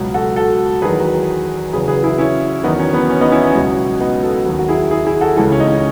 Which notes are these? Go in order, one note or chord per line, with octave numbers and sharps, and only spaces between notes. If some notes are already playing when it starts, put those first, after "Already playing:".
Already playing: C#2 B2 F#3
F#4 A4
F#4 A4
E2 D#3 F#3 G#4 B4
E2 C#3 F#3 G#4 B4
G#4 B4
E4 G#4
C#4 E4
E2 D#3 F#3 B3 D#4
C#4
B3
C#4
B3 D#4
C#4 E4
C#4
C#2 B2 F#3
B3 D#4
F#4 A4
D#2 D#3 F#3
F#4
E4 G#4
E4 G#4
E4 G#4
F#4 A4
C#2 C#3 E3 F#4 A4
C#4
D#4
C#4